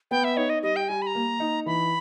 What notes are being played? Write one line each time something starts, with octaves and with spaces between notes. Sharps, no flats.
B3 G5
E5
D#4 C#5
D#5
G3 D#5
G5
G3 G#5
B5
A#5
A#3
D#4
E3 B5